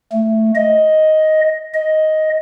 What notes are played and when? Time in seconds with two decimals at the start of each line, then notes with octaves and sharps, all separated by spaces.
0.12 A3
0.55 D#5
1.74 D#5